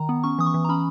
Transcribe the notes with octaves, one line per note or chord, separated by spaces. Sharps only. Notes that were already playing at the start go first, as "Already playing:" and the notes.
Already playing: D#3 A#5
B3
C#4 C#6
E3 D#6
C#6
E3
A#5
C#4 B5